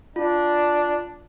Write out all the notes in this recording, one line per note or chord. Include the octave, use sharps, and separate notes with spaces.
D4 F4